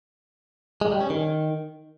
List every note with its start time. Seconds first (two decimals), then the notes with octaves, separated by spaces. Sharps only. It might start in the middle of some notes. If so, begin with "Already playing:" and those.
0.81 G#3
0.91 G3
1.01 C#4
1.10 D#3